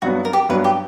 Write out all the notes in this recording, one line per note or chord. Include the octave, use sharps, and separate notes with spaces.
G2 F#3 B3 F#4
A#4
G4
G2 F#3 B3 B4
G4